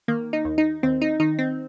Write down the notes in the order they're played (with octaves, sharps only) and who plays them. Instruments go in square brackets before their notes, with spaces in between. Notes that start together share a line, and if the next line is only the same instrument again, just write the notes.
[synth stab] D#3 A#3
D#4
D#2
D#4
D#2 C4
D#4
D#3 D#4
C4